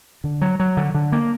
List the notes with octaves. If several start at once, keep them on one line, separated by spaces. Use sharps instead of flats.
D3
F#3
F#3
D3
D3
A#3